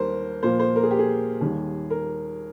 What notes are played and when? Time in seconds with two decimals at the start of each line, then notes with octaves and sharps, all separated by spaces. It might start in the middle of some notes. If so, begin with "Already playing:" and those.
Already playing: D#2 D#3 G3 A#3 A#4 C5
0.43 A#2 F3 A#3 C5
0.59 C5
0.76 A#4
0.83 G#4
0.91 G4
0.99 G#4
1.41 D#2 D#3 G3 A#3
1.90 A#4